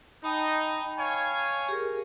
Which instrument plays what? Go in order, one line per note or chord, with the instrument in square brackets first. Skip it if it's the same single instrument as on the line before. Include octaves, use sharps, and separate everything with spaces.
[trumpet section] D#4 [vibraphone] G5 A5 B5
[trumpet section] C#5 F5 G#5
[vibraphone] G4 G#4 A#4